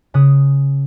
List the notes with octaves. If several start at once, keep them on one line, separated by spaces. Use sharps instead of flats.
C#3 D#6 F#6